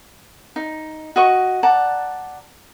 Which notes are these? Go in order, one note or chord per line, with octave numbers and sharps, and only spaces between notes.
D#4
F#4 D#5 C#6
D5 F#5 A5 A#5